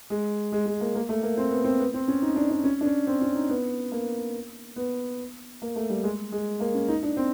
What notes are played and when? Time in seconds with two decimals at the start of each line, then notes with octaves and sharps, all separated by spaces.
0.10 G#3
0.52 G#3
0.66 G#3
0.81 A#3
0.95 A#3
1.09 A3
1.23 A#3
1.37 C4
1.51 B3
1.64 C4
1.80 B3
1.94 C4
2.08 C#4
2.22 D#4
2.36 D4
2.50 D4
2.64 C#4
2.81 D4
2.85 C#4
3.07 C4
3.21 C#4
3.35 D#4
3.49 B3
3.92 A#3
4.76 B3
5.62 A#3
5.76 A3
5.90 G3
6.04 G#3
6.32 G#3
6.60 A#3
6.75 C#4
6.88 D#4
7.03 D4
7.17 C4